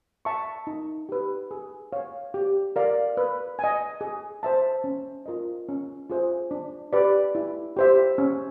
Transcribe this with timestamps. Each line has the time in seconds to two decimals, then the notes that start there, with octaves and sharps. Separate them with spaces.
0.25 E5 A5 C#6
0.67 D#4
1.09 G4 B4
1.51 G#4
1.93 C#5 F5
2.34 G4
2.76 A#4 D5 F5
3.17 B4
3.59 D#5 G#5
4.01 G#4
4.43 C5 E5 A5
4.84 C#4
5.26 F4 A#4 D#5
5.69 C#4
6.10 F4 G#4 C5 E5
6.51 D4
6.93 G4 B4 D5
7.35 E4
7.77 G4 C5 E5
8.18 C#4